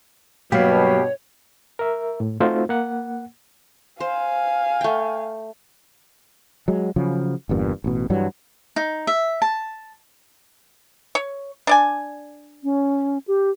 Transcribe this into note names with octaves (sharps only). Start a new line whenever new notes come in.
G2 B2 F#3 A#3 B3 G4 C#5 F5
A#4 E5
A2
A3 C4 D#4 F4 F#4 C5
A#3 F#5
C5 F5 G#5
A3 G5
F#3 G#3
C#3 F3 F#3
G1 E2 G2 A#2
A1 B2
G2 E3 F#3 G3
D#4
E5
A5
C#5
D4 D5 G#5
C#4
G4